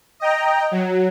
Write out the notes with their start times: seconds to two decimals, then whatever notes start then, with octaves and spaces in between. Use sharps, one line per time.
0.20 D#5 G5 A#5
0.71 F#3